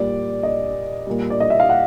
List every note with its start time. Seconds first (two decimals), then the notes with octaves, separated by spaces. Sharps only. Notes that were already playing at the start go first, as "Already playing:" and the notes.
Already playing: A#2 G3 D5
0.43 D#5
1.06 A#2 G3
1.30 D5
1.40 D#5
1.50 E5
1.60 F5
1.69 F#5